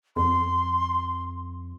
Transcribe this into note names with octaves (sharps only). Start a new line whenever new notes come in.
F2 C6